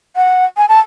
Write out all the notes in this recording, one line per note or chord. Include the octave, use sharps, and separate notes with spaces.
F#5
G#5
A5